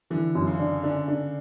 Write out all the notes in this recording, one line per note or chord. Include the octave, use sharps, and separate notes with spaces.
D3 E3
F#2
C#3
D4
D3 D4
D3 D4